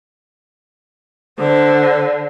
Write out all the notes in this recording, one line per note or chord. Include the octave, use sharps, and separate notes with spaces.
D3 C5